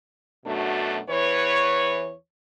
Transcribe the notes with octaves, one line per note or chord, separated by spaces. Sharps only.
F#2 B2 A3 D4 F#4
E2 E3 B4 C#5